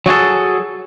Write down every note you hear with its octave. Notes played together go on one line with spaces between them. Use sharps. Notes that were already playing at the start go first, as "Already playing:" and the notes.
F#3 F#4 G#4 A4